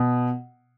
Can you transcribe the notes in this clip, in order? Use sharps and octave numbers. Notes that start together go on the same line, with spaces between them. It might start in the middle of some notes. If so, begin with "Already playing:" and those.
Already playing: B2